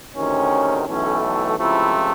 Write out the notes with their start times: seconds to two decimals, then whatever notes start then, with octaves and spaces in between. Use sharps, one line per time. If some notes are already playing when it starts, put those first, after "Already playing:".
0.16 D2 C3 D#3 C#4
0.87 B1 A2 E3 A3 C#4
1.59 C#2 C3 F3 A3 E4